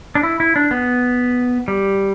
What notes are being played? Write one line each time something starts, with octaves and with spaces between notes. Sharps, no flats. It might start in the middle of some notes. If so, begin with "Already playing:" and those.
D4
E4
E4
D4
B3
G3